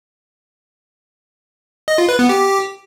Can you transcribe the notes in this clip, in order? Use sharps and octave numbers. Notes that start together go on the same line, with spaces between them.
D#5
F4
B4
B3
G4